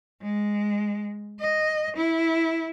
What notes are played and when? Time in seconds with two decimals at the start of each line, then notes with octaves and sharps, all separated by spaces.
0.22 G#3
1.39 D#5
1.96 E4